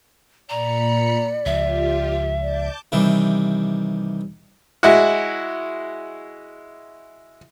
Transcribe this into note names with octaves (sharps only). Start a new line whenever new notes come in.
A#2 D5 A#5 B5 C#7
C#2 F3 F4 G4 E5
D5 A5 D6 G6
C3 D#3 E3 G3
G#3 E4 F#4